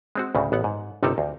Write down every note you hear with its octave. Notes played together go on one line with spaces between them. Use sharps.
G#3 C4 F#4
D2 A2 C#3
A1 B3 F#5
G#2
G1 C3 G3 D#4 A4 A#4
D2